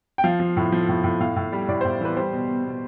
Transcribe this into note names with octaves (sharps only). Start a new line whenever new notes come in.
G5
F3 F5
F3
A2
F3
A2
A2
A2 F5
A2
G3
A2 D5
A2 C5
E3 B4
G3 C5
B2
B2
B2